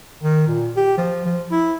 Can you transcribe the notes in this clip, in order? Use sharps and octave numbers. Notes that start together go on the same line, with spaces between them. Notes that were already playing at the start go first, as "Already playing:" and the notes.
D#3
A#2
G4
F3
F3
E4